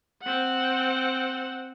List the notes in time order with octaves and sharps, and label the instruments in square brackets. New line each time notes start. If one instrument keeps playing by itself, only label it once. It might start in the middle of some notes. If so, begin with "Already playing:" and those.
[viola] C4 F#5